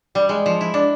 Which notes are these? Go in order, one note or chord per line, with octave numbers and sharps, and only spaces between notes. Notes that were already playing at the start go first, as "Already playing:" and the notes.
G3
G#3
F3
E4
D4